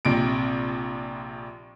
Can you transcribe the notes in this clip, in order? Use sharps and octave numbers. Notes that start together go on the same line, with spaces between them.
A#1 C3 D7